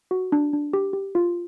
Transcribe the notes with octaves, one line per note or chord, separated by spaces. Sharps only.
F#4
D4
D4
G4
G4
F4